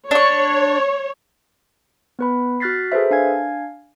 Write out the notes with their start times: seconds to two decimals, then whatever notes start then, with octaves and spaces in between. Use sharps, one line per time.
0.11 D4 C#5 C#6
2.19 B3 B4 B5
2.60 F#4 F6 F#6 A6 B6 C7
2.92 G#4 A4 B4 C5 E5
3.11 D4 F5 G#5 G#6